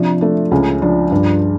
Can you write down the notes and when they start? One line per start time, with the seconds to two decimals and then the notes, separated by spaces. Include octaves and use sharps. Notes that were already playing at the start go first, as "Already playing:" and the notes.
Already playing: C3 F3 D4
0.21 A3 D4
0.51 C#2 C#4
0.82 F3 D4
1.11 G2 D4